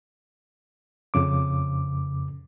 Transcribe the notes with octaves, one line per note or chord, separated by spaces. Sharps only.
F2 C#3 D6